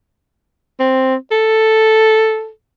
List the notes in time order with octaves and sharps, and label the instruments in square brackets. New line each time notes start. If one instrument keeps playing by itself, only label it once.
[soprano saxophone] C4
A4